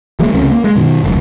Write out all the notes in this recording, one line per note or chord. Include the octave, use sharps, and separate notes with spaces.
E3 F#3 G#3 A#3
C#2 C3 A3 C#4
A#3
G#3
F#2 B2 D#3
F1 C#2